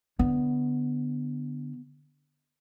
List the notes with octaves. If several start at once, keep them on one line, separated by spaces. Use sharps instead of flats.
D3 B3